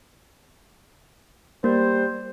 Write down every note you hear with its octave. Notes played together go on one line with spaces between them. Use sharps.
G3 A#3 C5